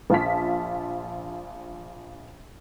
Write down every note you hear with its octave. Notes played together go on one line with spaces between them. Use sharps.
A#1 F4 A5 B6